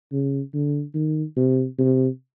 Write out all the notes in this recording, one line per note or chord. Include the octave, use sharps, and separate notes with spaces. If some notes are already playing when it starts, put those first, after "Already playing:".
C#3
D3
D#3
C3
C3